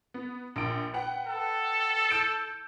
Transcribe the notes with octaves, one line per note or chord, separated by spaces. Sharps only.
B3
A#1 A#2 D7
B4 F#5 G5
A4
E6 G6 D7